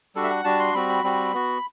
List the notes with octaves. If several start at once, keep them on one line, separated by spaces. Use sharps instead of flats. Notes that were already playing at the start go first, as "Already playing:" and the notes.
G3 D4 F#4 A4
E5
F#5
G3 D4 F#4 A5
C6
G3 C4 F#4 B5
B5
G3 C4 F#4
B3 F#4